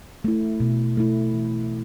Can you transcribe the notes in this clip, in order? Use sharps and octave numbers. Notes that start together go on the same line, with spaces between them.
A3 E4
B2
A3 E4
E3